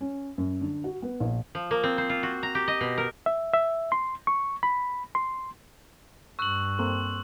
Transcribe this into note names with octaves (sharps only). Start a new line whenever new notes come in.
C#4
F#2
D3
F#4
B3
A#1
F3
A#3
C4
C5
F4
F#4
A#5
G4
D#5
B2
A#4
E5
E5
C6
C#6
B5
C6
G2 C#6 E6 F#6 F#7
A#3 C4 A4 C6